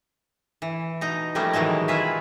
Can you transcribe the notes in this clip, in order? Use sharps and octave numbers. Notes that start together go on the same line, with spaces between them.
E3
B2 D#4 A#5
F3 G3 A3 A#3 C#4
B2 D#3 E3 F#3 G#3
E4 F4 G#4 B4 E5 F5